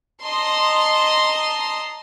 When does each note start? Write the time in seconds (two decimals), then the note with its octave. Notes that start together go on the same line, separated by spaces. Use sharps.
0.22 D#5 A5 A#5 C6